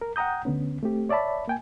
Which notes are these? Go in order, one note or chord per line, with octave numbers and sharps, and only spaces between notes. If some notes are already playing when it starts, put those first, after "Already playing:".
A#4
F#5 G5 A#5 D#6 G6
D2 D3 B3 C#4
A3 C4 G4
C#5 D5 E5 A5 B5
A#3 G5 G#5